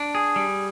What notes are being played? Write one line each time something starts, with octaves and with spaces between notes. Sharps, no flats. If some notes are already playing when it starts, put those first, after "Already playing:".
Already playing: D4
G#4
G3